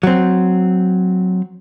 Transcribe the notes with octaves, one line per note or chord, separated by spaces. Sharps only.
F#3 C4